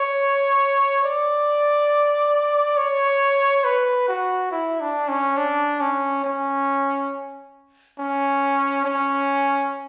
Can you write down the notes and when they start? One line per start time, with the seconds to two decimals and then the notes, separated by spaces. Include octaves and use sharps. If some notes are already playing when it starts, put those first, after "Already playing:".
Already playing: C#5
1.04 D5
2.77 C#5
3.64 B4
4.08 F#4
4.51 E4
4.80 D4
5.08 C#4
5.37 D4
5.81 C#4
6.24 C#4
7.99 C#4
8.85 C#4